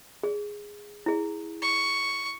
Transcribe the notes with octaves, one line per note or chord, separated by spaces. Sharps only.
G#4
E4 G#4
C#6